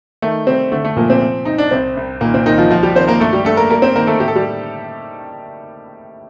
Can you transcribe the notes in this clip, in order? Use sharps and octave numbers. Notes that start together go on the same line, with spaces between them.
D#3 A3
C3 G3 C4
D3 A3
A3
A#2 F3 A#3
C3 C4
C3
C3 D#4
D4
C2 C3 C4
C2
A#2 D#3 A#3
C3 C4
C2 D#3 D#4
F3 F4
C2 F3 F4
G3 G4
D#3 C4 C5
A#3 A#4
G2 A3 A4
G3 G4
G2 A3 A4
A#3 A#4
G3 A#3 A#4
C4 C5
D#3 A#3 A#4
A3 A4
A2 G4
A4
G3 G4